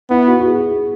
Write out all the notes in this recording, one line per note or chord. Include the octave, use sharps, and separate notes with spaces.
B3 E4
F#4
F#4
G#4